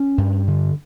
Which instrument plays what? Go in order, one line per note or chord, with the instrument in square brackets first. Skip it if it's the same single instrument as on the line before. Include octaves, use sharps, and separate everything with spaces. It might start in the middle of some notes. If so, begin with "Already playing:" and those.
Already playing: [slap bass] C#4
G2
D3